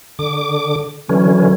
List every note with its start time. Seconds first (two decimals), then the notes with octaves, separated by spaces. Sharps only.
0.19 D3 D6
1.09 D3 E3 F#3 C#4